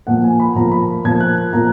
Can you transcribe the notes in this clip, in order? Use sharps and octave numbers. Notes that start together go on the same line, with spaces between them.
A#2 F3 A#3 F#5
G#5
B5
A#2 F3 A#3 A#5
B5
A#2 F3 A#3 G#6
F#6
A#2 F3 A#3 A#5